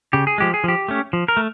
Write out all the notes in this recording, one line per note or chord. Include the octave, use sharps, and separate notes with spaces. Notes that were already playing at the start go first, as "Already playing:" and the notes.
C#3 G4
G#4
F3 G#3 G4
G#4
F3 G4
A3 C#4
F3
A#4
A3